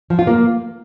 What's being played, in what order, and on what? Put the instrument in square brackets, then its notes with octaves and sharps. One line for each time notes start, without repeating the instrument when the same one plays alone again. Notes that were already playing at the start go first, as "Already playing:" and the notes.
[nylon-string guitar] F3
F4
A#3